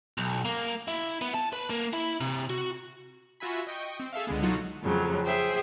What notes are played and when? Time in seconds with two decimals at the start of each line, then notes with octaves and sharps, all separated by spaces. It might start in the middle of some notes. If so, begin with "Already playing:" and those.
0.18 B1
0.45 A#3
0.88 E4
1.22 B3
1.34 A5
1.53 B4
1.70 A#3
1.93 E4
2.21 C3
2.50 F#4
3.40 F4 F#4 E5 G#5 B5
3.67 D#5 G5 C#6
4.00 C4
4.13 G#4 A4 E5 F5
4.27 C#2 D3 G#3 B3
4.42 B2 F#3 D#4 F4 F#4 A4
4.82 F2 C#3 F#3 A3
5.25 G#4 C5 E5 G5